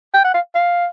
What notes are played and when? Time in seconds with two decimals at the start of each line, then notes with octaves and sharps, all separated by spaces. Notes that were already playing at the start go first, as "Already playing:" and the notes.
0.14 G5
0.24 F#5
0.34 F5
0.55 F5